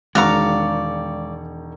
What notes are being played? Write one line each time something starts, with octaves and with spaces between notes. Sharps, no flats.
E1 D#3 G#3 F#4 D5 F5 A#5 C#6